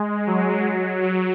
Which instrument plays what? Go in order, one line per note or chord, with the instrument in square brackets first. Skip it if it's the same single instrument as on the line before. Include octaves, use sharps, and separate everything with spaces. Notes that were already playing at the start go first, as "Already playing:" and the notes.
Already playing: [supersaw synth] G#3
F#3
F#3